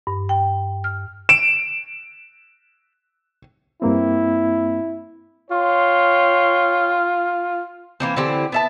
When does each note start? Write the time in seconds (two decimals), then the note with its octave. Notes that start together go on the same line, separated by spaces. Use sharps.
0.07 G2
0.29 G5
0.84 F6
1.29 D7 E7
3.82 G2 A#3 C4 E4
5.51 F4 C#5 G5 C6
8.00 E3 A#3 C4
8.16 D3 E3 C4 G4
8.52 B3 E5 A5